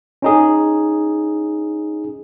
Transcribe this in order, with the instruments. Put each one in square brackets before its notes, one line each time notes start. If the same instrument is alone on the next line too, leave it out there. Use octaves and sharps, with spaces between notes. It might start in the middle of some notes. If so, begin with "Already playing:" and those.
[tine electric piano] C#4 D#4 G#4